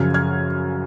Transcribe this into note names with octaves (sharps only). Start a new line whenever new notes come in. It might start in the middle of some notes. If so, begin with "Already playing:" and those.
Already playing: F#2 C#3 F3 F6 G#6
F6 G#6